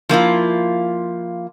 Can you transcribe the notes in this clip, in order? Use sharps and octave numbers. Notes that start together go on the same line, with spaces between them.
F3 A#3 E4 F4